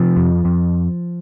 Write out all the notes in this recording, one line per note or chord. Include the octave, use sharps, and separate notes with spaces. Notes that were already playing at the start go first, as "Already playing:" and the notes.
Already playing: C3 F3
F2
F2